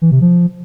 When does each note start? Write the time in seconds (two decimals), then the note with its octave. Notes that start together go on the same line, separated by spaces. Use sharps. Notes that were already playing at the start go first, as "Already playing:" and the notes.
0.02 E3
0.11 C3
0.21 F3